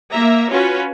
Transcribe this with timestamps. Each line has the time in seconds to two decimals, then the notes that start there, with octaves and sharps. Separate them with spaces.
0.11 A#3 E5 A#5
0.50 C#4 F4 F#4 B4